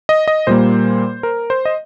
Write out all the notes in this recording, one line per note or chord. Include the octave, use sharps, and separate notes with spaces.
D#5
D#5
A#2 G3 A#3 C5
A#4
C5
D#5